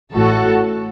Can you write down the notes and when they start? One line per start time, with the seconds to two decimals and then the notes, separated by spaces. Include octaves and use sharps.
0.13 A1 A2 A3 F#4 A4